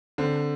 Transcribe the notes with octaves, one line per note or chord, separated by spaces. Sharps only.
D3 C4